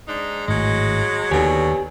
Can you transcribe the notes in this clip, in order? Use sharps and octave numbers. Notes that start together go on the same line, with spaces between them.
G#2 D4 D#4
G#1 A2 F#3 G#3
D#2 B2 D3 D#3 F#3 G4 G#5